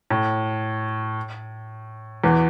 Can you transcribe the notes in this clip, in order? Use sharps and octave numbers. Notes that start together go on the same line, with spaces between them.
A2
E2 E3